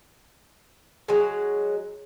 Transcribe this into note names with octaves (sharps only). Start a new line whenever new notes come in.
F#3 G#3